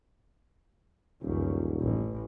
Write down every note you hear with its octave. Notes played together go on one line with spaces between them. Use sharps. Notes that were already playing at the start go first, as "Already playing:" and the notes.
D#1 C#2 F#2
A1